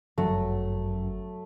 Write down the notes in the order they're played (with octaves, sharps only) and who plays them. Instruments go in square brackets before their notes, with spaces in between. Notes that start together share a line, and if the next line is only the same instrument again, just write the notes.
[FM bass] G1 [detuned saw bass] F#2 [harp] F#3 [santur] A3